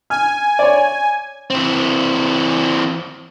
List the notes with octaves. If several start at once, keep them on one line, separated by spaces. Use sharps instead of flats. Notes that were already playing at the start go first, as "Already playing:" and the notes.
G#5 F6
C#5 D5
E3 C4